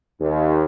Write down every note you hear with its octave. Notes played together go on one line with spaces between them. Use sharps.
D#2